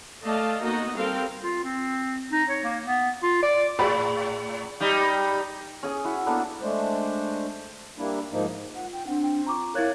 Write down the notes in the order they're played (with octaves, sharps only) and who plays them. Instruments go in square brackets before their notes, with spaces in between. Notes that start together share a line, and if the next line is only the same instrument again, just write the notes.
[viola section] A3 D5 D#5 F5 A5
A#3 B3 D#4 F#4 D#5
G3 C4 A4 A#4 F5 G5
[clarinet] F4
C4
D#4
C#5
A#3
B3
F4
D5
[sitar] A2 [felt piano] G#4 D5 B5
[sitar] G3 D#4
[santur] C#4 G#4 D#6
E4 F#4
A#3 B3 D4 A4
[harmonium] G#3 A3 D4 C5
G3 A#3 D4 E4
G#2 F3 A#3 D#4
[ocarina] F4 [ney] F#5
[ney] G5
[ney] C4 [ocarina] D4 [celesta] F#5
[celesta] G5
[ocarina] F4 [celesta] A#5 C#6 D6
[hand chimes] E4 C#5 [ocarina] A#4 [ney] F5 [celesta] F#6 G#6 A6